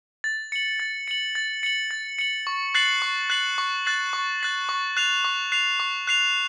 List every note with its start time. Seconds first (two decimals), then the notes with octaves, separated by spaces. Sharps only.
0.24 A6
0.52 C#7 F#7
0.80 A6
1.08 C#7 F#7
1.35 A6
1.63 C#7 F#7
1.91 A6
2.19 C#7 F#7
2.47 C#6
2.74 F#6 A6 C7 F#7
3.02 C#6
3.30 F#6 A6 C7 F#7
3.58 C#6
3.85 F#6 A6 C7 F#7
4.13 C#6
4.40 F#6 A6 C7 F#7
4.69 C#6
4.97 F#6 C7 F7
5.25 C#6
5.52 F#6 C7 F7
5.80 C#6
6.07 F#6 C7 F7